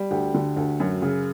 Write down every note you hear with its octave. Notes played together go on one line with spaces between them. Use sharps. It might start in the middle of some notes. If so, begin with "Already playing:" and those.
Already playing: G3
D2 G4
D3
D2
F#2
C#3